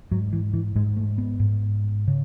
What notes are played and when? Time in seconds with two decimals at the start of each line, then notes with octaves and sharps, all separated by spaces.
0.11 G#2 F#3
0.33 E3
0.53 E3
0.75 G#2 G#3
0.97 A3
1.18 B3
1.39 G#2
2.08 C#3